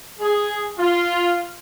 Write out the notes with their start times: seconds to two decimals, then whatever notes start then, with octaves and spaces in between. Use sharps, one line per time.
0.20 G#4
0.79 F4